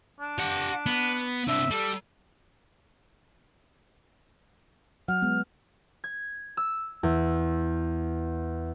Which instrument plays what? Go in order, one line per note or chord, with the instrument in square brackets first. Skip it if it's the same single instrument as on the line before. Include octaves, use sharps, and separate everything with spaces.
[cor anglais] D4
[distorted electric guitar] G4 F#5
B3
[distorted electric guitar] C3 D4 [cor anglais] E5
[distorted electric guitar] G3 [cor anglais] A4
[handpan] F#3 F#5 [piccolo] F6
[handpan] G#3 B3
[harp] G#6
E6
E2